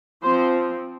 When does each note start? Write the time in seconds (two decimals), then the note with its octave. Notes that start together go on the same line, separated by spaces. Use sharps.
0.23 F3 C4 C5